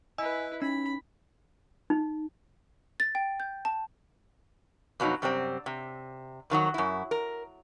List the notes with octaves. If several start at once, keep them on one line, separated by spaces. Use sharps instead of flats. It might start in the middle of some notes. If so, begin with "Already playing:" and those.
E4 B4 D#5 G#5 E6
C#4 D#4 B5
D#4
A6
G5
G6
A5
F2 B2 F#3 D#4
F#2 C3 G3 C4
C3
F2 D#3 F#3 F#4
F#2 E4
A#4